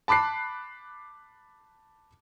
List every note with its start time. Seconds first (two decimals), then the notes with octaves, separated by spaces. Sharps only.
0.08 A5 B5 D6 F#6 C7